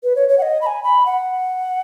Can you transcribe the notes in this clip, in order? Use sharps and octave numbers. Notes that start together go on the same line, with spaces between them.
B4
C#5
C#5
F#5
D#5
B5
G#5
B5
F#5